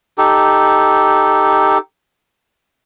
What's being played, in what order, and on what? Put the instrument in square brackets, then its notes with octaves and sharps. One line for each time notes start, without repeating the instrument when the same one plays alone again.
[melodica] D#4 G4 A4